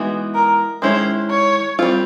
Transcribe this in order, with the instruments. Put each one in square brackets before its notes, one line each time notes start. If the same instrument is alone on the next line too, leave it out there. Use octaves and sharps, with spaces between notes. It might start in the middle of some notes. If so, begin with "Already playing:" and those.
Already playing: [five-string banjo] E3 G#3 B3 D#4 F#4
[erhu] A#4
[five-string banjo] D#3 G#3 C#4 E4 [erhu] C5
[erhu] C#5
[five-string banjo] G3 C4 F4